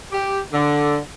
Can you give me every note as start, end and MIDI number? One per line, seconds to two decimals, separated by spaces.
0.12 0.40 67
0.53 0.97 50